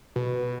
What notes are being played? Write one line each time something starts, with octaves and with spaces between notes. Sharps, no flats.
B2